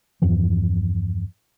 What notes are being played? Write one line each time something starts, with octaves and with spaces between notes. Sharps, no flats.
E2 G2 E3 F3